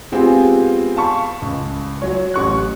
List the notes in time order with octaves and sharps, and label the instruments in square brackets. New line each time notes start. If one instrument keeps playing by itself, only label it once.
[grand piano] G#3 B3 C4 F4 G4 G#4
F5 A5 B5 C#6
C#2
F#3 C#5
A1 C#6 F#6